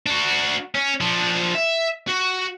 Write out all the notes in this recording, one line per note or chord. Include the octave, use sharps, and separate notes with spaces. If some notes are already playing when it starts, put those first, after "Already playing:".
D4 F#4
C#4
F3 D4
E5
F#4